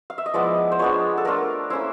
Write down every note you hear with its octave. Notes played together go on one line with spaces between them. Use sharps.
F5
E5
D#5
F3 G#3 B3 E4 D5
C5
F3 G#3 B3 D4 C#5
A4
A3 D4 F4 A#4
A#3 C#4 E4 C5